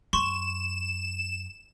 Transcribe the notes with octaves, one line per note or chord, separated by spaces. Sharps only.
F#2 C6 C#6 E7